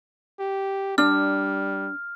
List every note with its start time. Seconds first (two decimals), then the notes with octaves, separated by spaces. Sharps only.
0.40 G4
0.98 G3 D4 F6